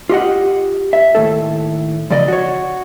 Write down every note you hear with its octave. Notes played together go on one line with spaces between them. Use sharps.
F4 G4 D#5 F#5
E5
D#2 A2 A4
F2 C#3 D5 D#5
F#4 C#5